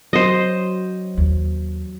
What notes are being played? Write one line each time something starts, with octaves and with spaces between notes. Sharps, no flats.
F#3 C5 D#5
D#2